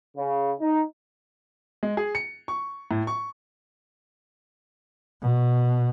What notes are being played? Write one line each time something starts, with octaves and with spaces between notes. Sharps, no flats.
C#3
D#4
G#3
G#4
C#7
C#6
A2
C#6
B2